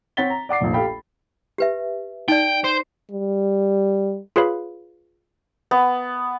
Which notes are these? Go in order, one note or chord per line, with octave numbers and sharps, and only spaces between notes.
C4 C#5 F#5 A6 B6 G7
A#5
D5 F#5 D6 C7
F1 A#1
G4 A4 F5 G5 B5
B5
G4 B4 E5
D#4 D5 G5
C5
G3
F4 G#4 B4 C#5 F5 B5
B3